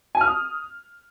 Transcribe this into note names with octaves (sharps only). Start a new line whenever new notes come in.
G#5
F6
D#6